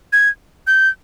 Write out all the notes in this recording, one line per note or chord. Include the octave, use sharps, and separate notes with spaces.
G#6
G6